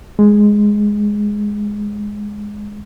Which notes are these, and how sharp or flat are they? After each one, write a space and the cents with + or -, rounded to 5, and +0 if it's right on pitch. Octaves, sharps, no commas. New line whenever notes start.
G#3 +0